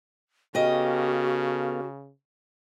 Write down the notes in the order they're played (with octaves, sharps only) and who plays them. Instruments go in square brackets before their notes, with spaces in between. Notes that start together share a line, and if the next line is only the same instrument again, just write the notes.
[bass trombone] C#3 [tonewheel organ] B3 A4 F5 [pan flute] F#4 [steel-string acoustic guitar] G4 D#5